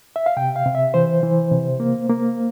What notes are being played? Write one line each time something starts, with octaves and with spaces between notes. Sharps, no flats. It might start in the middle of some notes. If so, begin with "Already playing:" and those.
E5
F5
C3 G5
F5
C3
E5
E3 C5
E3
C3
A#3
A#3